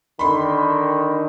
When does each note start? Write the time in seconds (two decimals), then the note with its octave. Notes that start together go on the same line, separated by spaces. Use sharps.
0.19 D3 D#3 B5 C6